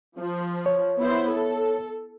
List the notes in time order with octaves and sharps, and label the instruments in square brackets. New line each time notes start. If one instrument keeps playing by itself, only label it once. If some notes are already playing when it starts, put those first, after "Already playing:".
[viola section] F3
[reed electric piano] C#5
[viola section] B3 E4 C5
A4